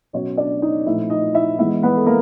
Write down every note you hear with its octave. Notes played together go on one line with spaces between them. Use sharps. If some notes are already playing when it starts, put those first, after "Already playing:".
B2 F#3 B3 C#4 C#5
D4 D5
D#4 D#5
A#2 F3 A3 C4 E4 E5
D#4 D#5
E4 E5
E3 G#3 B3 E4 E5
B3 B4
A4
A#3 A#4